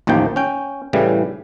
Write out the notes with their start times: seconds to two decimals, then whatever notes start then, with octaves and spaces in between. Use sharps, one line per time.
0.07 A1 D#2 D#3 F3 G5
0.36 C#4 G5
0.93 A2 C#3 E3 G3